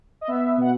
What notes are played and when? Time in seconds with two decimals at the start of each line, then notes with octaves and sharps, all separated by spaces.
0.21 D#5
0.28 B3 E5
0.57 B2 F#5